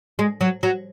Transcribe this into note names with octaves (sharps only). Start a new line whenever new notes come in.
G#3
F#3
F#3